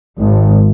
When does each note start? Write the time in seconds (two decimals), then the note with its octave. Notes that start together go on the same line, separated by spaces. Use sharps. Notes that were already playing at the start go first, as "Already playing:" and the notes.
0.19 G#1